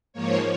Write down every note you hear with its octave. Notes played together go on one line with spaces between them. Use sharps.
G#2 F3 A#3 C#5